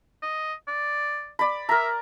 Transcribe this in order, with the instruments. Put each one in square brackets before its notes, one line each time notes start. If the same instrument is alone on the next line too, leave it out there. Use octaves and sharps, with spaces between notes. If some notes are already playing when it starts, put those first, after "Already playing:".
[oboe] D#5
D5
[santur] D5 B5
[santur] A#4 A#5 [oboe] E5